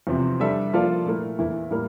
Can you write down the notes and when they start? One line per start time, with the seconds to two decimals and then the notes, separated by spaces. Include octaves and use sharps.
0.07 E2 C3 F3 C4
0.40 G3 D4 A4 E5
0.73 F3 A#3 F4 A4 D5
1.06 A#2 A3 E4 A#4
1.39 E2 E3 A#3 E4
1.71 A2 G3 A#3 E4 A#4